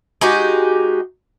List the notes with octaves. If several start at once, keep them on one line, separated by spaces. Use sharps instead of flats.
G#3 D#4 F#4 G4